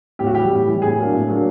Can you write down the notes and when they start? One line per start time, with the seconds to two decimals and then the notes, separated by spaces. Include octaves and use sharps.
0.19 A2 G4
0.27 F#4
0.34 E3 G3 G4
0.51 A2
0.66 E3 G3
0.82 A2 G#4
0.98 F#3 A#3 D4
1.13 A2
1.28 F#3 A#3 D4